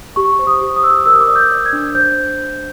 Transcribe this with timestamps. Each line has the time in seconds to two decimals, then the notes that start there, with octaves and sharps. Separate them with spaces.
0.16 G4 C#6
0.39 C5
0.47 D#6
0.61 G4
0.76 D#6
0.83 C5 E6
0.90 D#6
1.06 A#4 E6
1.13 D#6
1.21 D6
1.28 D5 D#6
1.36 G6
1.51 D5
1.66 G#6
1.73 D4
1.95 C5 G6